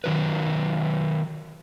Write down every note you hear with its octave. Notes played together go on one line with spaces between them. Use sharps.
D#3 F#3 B4